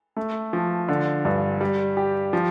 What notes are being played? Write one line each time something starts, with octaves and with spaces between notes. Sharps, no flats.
A3
F3
D3
G2
G3
G4
F3